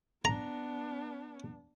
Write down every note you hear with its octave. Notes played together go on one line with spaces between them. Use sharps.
B3 D4 A#5